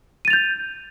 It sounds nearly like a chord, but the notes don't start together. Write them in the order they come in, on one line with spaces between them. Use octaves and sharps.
D#7 A6 F7 G6